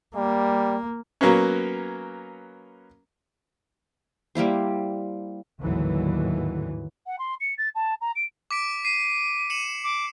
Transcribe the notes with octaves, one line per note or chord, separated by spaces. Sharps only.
G3 A#3
F#3 A#3 B3 C#4
G3 A#3 E4 C5
G#1 D#2 A2 D3 E3 F#3
F#5
C6
C#7
A6
A5
A#5
D7
D6 B6 D7
C7 D#7
C#7 E7 F#7
D6